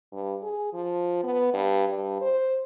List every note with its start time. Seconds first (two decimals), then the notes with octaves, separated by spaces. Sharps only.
0.12 G2
0.42 G#4
0.73 F3
1.23 B3
1.53 G2
1.88 G2
2.21 C5